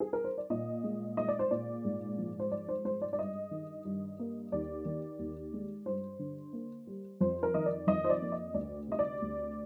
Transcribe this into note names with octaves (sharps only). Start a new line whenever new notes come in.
G#4
A#4
C5
D5
A#2 D#5
G#3
G#3 D#5
D5
C5
A#2 D5
G#2
F3
C5
G#2 D5
C5
G#3 C5
D5
D5
G2 D#5
D#3
G2
A#3
D#2 D5
D#3
D#2
G#3
G2 C5
D3
A#3
G3
F2 C5
A#4
D#3 D#5
D5
F2 D#5
C5
D5
A#3
D#5
D2 D5
C3 D#5
D5
D2